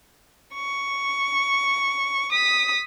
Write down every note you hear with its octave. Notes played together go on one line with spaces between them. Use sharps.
C#6
D#6 B6